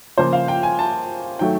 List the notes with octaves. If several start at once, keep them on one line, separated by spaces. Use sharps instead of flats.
C#3 F3 A#3 C5
F5
G5
G#5
A5
D#3 F#3 A3 G5